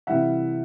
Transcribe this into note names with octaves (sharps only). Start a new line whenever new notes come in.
C3 E3 G3 E5 F#5